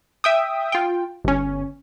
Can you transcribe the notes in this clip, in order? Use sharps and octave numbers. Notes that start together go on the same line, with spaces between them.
E5 G5 D#6
F4 G5
G1 C#4